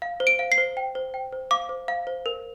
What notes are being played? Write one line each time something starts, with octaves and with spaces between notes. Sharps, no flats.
F5
C5
D7
F5
C7
C5
G5
C5
G5
C5
F5 D6
C5
F5
C5
A#4